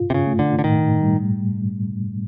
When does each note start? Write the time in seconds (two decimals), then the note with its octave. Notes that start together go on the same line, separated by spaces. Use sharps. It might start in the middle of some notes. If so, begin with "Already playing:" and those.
Already playing: F4
0.10 C3
0.14 C#3
0.27 A3
0.39 D3
0.59 D3
0.64 A2 D#3
1.01 G3